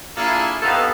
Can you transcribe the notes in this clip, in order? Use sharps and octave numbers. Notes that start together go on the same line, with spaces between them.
A#3 D4 E4 F4 G#4 A4
G2 D#3 B3 A4 F5